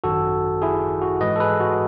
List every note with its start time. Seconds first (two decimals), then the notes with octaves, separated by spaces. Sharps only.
0.04 G#1 F#2 D#3 F#4 A4
0.62 E4 G#4
1.02 F#4
1.21 G#2 E3 G#3 B4 D#5
1.36 A4
1.40 G#4 B4
1.60 F#4